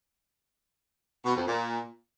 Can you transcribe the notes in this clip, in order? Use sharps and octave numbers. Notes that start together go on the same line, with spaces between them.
B2
F2
A#2